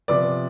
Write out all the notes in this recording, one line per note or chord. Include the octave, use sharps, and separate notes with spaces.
C3 F3 B3 D5